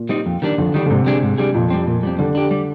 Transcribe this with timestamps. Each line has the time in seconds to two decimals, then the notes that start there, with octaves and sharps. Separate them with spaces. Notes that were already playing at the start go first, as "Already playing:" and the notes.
Already playing: A#2
0.09 G3 C4 D#4
0.26 F2
0.42 D#3 G3 D4
0.58 F2 D3
0.74 D#3 G3 D4
0.86 D3
0.90 G#2 C3
1.06 G3 D4 G#4
1.23 G#2
1.38 G3 D4 G#4
1.54 F2 A#2
1.70 G3 C4
1.87 A#2
2.03 G3 C4
2.19 D3 G3
2.35 D4 G4
2.51 G3